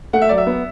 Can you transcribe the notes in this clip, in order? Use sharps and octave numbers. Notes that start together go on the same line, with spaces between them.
A3 F#5
E5
F#3 D5
E5
B3